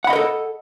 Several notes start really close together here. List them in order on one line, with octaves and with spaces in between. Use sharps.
F#5 B5 D#5 A#4 A4